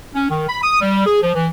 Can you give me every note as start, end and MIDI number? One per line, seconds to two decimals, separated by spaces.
0.15 0.29 61
0.30 0.48 51
0.49 0.58 83
0.63 0.79 87
0.81 1.05 55
1.06 1.18 68
1.22 1.32 53
1.35 1.48 52